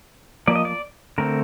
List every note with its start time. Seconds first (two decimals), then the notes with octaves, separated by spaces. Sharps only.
0.47 F3 A#3 D5
0.55 D#5
0.65 D5
1.18 D3 A3 C4 A#4